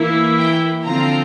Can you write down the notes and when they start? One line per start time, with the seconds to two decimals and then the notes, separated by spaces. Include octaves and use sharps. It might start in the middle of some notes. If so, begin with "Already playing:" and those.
Already playing: E3 A#3 E4
0.38 G5
0.85 D3 F3 C4 F4 A#5